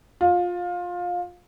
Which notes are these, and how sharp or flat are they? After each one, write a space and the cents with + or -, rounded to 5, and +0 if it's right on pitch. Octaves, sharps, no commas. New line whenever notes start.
F4 +20